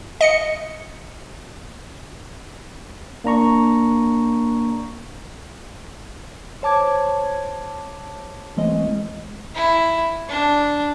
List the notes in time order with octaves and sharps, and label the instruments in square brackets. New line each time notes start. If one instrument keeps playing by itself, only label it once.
[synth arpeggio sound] D#5 C#7
[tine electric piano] A#3 D4 A#5 C#6
[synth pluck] C5 C#5 A5 D6 G#6
E3 G#3 A3 C4 C#4 D#5
[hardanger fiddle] E4
D4